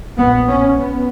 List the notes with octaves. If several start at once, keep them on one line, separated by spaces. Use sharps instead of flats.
A#1 A#2 B3
C#4
B3